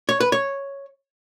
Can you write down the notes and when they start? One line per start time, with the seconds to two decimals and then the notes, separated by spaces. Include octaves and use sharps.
0.09 C#5
0.20 B4
0.32 C#5